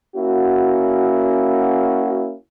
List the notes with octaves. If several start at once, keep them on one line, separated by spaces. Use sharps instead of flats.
A#3 C#4 E4 F#4